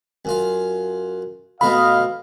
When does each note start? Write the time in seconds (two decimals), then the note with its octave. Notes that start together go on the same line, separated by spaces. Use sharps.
0.25 F#2 F4
1.61 B2 A3 F4 D#5 F5 B5